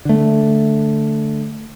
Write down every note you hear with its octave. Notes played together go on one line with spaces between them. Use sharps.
D3 A3